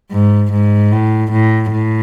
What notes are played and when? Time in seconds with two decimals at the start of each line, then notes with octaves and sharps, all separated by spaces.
0.12 G#2
0.52 G#2
0.92 A2
1.31 A2
1.72 A2